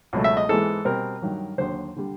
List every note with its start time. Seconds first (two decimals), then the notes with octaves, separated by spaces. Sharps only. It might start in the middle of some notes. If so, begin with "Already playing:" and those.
0.13 C#2 B2 F#3 A3
0.24 E5
0.37 D#5
0.49 G#2 E3 G#3 B3 A4
0.85 B2 G3 C4 A#4
1.22 G2 D#3 F#3
1.58 D#2 D3 F#3 C5
1.96 D3 G3